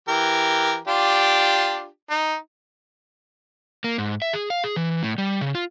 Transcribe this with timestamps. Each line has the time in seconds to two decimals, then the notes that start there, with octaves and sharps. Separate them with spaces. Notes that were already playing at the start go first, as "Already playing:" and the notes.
0.08 E3 G4 A#4
0.88 D4 F4 G4
2.10 D#4
3.84 A#3
3.98 G#2
4.22 E5
4.33 G#4
4.50 F5
4.64 G#4
4.76 E3
5.03 A2
5.18 G3
5.41 C#3
5.55 F4